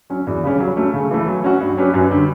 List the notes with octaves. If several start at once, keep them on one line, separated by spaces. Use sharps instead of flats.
F#3 C#4
E2
C#3 G3 C#4
F#3
A3 C#4
C#3
E3 A3
F#3
C#4 F#4
G2
F#3 C#4 G4 B4
F#2
D3 G3